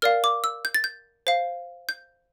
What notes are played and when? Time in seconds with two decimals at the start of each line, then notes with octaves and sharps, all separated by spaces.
0.02 A#4 D5 F5 F6
0.24 D6
0.44 E6
0.65 G6
0.74 A6
0.84 G6
1.27 C5 F5
1.89 G6